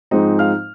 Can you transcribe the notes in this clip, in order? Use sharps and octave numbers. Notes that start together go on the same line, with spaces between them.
G#2 F3 G#3 C4 D#4
F5 F6